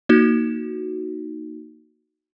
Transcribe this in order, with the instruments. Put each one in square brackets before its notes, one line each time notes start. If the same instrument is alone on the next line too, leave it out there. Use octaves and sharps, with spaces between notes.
[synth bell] A#3 D#4 F#4